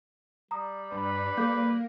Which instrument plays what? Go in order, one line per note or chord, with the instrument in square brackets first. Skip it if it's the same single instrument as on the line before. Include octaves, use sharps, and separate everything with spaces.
[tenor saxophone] G3 [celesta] A#5 D#6
[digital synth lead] G2 [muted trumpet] B4
[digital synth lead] A#3 [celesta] A4 D6 G6